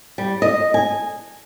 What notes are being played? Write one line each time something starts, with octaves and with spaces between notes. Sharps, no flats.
G3
D#5
G#5